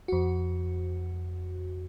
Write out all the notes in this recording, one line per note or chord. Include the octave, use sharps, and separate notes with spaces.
F2 F#4